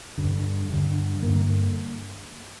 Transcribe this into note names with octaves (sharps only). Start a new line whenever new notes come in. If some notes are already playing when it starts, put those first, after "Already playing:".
G2 D3
G2 D3
G2 D3 A#3